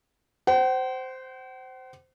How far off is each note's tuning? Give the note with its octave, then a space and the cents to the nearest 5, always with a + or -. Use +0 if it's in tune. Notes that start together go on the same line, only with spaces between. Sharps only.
C5 -10 F#5 +45